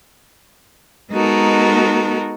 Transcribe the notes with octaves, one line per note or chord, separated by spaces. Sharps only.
G#3 B3 D#4 F#4 A4 A#4